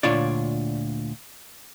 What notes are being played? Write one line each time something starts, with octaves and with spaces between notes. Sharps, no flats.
D2 A#2 D4 F4 C#5 D5